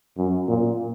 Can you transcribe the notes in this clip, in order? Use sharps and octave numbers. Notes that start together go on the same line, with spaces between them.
F#2
A#2